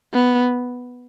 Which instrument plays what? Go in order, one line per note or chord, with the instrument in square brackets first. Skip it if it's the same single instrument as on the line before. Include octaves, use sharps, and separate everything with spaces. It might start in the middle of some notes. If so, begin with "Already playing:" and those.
[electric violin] B3